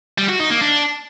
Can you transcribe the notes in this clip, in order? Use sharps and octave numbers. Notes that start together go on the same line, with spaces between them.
G3
F#4
D#4
A#3
D4